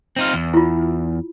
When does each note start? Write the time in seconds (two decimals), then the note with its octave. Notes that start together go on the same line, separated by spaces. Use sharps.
0.16 C4 D#4 F4
0.33 E2
0.54 E4 F4